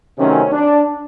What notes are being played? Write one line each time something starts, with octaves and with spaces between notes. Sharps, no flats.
C3 D#3 F#3 A3 C4 C#4
D4